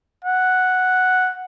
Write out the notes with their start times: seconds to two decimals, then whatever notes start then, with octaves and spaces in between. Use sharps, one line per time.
0.25 F#5